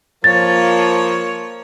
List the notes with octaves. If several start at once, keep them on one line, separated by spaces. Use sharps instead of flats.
F3 A#3 C#5 A6